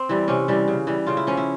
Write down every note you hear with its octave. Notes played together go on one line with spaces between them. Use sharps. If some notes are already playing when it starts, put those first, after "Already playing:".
Already playing: C4
E3 G3
C3 C#4
E3 G3
C#3
E3 G3
C#3 F4
E4
F3 C#4
E4